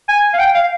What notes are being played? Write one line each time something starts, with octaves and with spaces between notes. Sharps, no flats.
G#5
F5
G5
F5